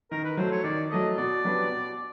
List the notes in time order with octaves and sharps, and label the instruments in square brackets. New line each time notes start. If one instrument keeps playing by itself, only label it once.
[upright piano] D#3 [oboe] A#4
[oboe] B4
[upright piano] F#3 A3 [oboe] C5
[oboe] C#5
[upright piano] D#3 [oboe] D5
[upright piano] F#3 A3 [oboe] D#5
[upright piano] B2 [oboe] D5
[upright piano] F#3 B3 D4 G4
B2